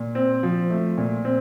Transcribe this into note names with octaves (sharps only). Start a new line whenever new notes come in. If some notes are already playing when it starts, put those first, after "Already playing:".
Already playing: A#2
C4
F3
A3
A#2
C4